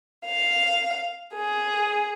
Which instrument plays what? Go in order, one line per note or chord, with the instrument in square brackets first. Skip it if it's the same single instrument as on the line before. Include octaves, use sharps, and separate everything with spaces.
[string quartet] F5
G#4